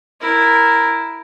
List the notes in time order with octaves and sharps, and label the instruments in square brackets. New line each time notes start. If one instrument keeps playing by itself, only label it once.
[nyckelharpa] E4 A#4